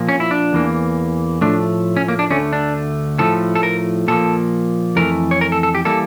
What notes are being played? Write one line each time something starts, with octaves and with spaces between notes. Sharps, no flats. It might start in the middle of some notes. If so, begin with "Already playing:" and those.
Already playing: A#2 F3 A#3
C#4
E4
D4
E2 E3 A#3
A2 F3 A3 D4
C#4
A#3
D4
D2 D3 A3 C#4
D4
A2 F3 A3 A4
A4
A#4
A#2 F3 A#3 A4
F2 E3 A3 A#4
C#5
A#4
A4
A4
G4
E3 G3 A#3 A4